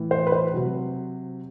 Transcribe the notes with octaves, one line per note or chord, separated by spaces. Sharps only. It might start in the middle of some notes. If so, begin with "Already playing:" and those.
Already playing: A2 E3
C5
B4
C5
C3 F#3